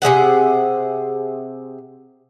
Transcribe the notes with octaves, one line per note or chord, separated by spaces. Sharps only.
C3 G#3 G#4 F#5